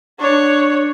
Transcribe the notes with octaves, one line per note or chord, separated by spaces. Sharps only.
D4 C#5